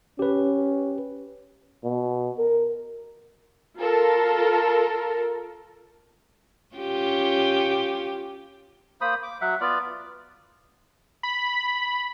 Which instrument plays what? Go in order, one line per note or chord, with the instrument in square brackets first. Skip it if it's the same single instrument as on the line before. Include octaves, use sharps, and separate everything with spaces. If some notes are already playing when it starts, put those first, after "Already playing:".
[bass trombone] C#4 [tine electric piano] G4 B4
[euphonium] B2
A#4
[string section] F4 A4 A#4
[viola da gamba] C#4 F4 G4
[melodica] A#3 C5 B5 D#6
D6
F#3 E5 F#5
B3 F4 D5
[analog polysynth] B5